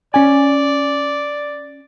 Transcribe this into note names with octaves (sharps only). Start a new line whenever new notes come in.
C#4 D5 G#5